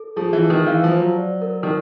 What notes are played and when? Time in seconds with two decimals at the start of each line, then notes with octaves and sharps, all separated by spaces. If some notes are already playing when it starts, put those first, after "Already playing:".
Already playing: A4
0.16 F3 G#4
0.33 E3
0.42 F4
0.50 D#3
0.67 E3 F5
0.84 F3
0.91 C5
1.00 F#3
1.17 D5
1.42 A#4
1.63 D#3